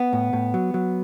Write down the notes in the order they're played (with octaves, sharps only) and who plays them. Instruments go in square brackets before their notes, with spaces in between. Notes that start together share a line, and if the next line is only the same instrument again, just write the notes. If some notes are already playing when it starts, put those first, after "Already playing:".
Already playing: [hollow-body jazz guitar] B3
A2
A2
F#3
F#3